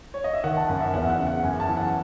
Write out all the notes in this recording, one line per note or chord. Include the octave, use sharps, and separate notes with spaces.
C#5
D#5
E5
D#3 F#5
A5
F#2 F#5
E5
E2 F#5
E5
F#5
C#3
F#5
F#2 G#5
A5
E3
F#5